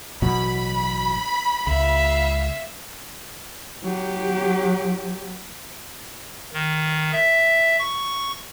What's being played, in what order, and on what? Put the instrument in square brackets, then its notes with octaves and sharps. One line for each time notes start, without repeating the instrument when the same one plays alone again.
[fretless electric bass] A1 B2 F#3 [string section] B5
[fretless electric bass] C#2 [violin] E5 F5
[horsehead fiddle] F#3 G4
[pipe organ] D#3
E5
C#6